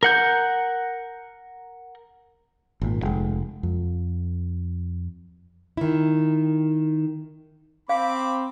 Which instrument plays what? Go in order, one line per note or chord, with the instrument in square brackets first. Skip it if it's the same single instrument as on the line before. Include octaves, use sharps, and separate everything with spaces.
[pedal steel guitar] A#4 F#5 G6
[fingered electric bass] G#1 A#2
F1 G#3
F2
[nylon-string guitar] D#3 E4
[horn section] C4 [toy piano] F5 [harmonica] B5 D6